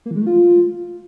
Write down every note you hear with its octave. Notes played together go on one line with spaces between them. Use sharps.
A#3
E3
G#3
A3
F4